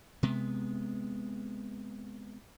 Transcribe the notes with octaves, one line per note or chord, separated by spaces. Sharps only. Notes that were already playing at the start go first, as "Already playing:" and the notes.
C3 G#3 B3